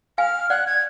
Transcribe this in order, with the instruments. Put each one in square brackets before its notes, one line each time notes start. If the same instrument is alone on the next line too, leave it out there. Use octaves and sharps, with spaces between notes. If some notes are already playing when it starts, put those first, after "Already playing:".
[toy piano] F5 G#5 [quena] F6
[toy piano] D5 F#5 [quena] F#6
[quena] G#6